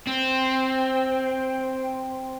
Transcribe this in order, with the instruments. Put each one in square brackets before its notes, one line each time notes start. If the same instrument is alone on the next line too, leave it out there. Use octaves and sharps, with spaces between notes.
[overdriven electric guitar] C4